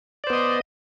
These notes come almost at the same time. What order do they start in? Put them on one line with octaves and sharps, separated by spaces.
D5 C5 B3 D#5